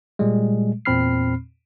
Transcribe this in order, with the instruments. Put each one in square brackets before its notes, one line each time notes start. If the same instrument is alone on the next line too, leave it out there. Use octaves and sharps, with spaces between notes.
[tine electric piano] A#2 G3 G#3
E2 A#2 C4 B5 F6 C7